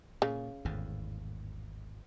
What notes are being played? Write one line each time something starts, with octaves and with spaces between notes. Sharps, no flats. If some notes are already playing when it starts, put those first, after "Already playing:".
A#2 C#3
G#1 E2 A2